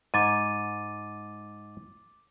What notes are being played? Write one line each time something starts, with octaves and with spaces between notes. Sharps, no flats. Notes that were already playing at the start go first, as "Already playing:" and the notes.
G#2 G#5 D6 A6 D#7